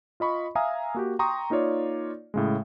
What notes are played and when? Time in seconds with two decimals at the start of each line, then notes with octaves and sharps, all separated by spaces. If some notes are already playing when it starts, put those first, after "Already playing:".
0.20 F4 D#5 B5 C#6
0.55 E5 F5 G#5 A#5 D#6
0.94 A#3 F#4 G4
1.19 G5 A#5 C6 C#6 D#6
1.50 A#3 D#4 F4 C#5 D5
2.34 A2 C#3 G#3